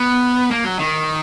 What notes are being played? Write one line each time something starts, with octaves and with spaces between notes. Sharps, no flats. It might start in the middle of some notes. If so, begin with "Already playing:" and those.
Already playing: B3
A#3
F#3
D#3